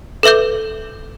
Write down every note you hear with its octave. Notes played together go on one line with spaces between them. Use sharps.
A4 B4 E5 D6 G6